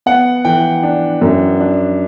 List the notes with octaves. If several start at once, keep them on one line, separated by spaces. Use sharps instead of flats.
B3 F#5
E3 G5
D4
F#2
D4